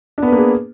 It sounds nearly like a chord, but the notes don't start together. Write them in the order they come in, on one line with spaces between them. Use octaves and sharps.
D4 B3 B4 A#3 G#4